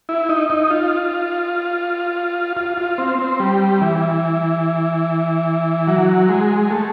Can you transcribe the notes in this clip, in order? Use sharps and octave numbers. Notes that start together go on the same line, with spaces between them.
E4
D#4
D#4
F4
F4
F4
C4
C4
G3
E3
F#3
G#3
A3